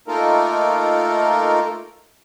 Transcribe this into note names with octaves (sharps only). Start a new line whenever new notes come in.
A3 A#3 D#4 F4 A4 A#4